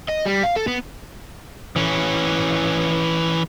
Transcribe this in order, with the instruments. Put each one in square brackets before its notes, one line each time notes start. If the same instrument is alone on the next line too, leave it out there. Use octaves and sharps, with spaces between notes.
[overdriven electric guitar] D#5
G3
F5
A4
B3
[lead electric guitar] E3 C#4